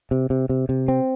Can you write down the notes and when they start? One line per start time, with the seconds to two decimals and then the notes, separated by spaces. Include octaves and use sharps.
0.11 C3
0.30 C3
0.49 C3
0.69 C3
0.88 C4